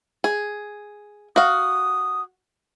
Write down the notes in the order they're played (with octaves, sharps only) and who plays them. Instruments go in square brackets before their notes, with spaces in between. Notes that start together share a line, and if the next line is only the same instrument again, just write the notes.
[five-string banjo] G#4
[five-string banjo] F#4 F5 [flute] D#6